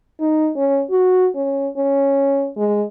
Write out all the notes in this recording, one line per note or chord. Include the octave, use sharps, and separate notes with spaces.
D#4
C#4
F#4
C#4
C#4
G#3